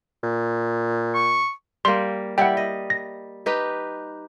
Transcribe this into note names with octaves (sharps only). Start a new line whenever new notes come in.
A#2
C#6
G3 A#3 C6
G3 E4 F#5 G5
D#5
A#6
D#4 G4 B4